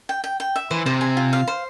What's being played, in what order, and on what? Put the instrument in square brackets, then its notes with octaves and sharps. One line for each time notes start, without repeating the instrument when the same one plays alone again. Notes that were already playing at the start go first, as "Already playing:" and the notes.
[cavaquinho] G5
G5
G5
E5
[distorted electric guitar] E3 [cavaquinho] C5
[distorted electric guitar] C3 [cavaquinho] C5
[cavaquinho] G#5
F4
F5
C5